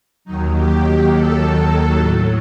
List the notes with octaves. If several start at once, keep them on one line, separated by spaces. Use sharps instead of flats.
D#2 D#3 F#3 D#4
G4
G4
D#2 D#3 F#3 A4
A2 F#3 A4